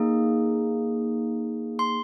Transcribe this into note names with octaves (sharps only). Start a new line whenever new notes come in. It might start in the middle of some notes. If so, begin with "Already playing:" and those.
Already playing: A#3 D#4 G#4
C6